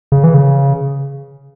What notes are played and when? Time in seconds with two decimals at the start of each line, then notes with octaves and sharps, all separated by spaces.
0.12 C#3
0.24 E3
0.34 C#3